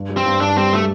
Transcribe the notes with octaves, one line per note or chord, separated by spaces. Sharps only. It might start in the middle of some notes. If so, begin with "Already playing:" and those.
Already playing: G2
G3
C4
G2
G2 D4
G3 C4
G3 A3